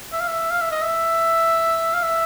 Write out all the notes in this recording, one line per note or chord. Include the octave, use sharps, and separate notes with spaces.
E5
F5
E5
F5
E5
D#5
E5
F5
E5